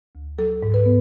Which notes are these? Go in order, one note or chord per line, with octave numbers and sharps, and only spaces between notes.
D2
F#3 A4
G#2
B4
B3